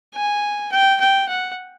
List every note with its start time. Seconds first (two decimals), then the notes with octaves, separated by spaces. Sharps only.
0.15 G#5
0.72 G5
1.00 G5
1.29 F#5